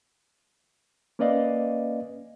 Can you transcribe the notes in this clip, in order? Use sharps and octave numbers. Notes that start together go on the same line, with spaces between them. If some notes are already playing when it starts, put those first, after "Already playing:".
A#3 C#4 B4 D5 D#5 F5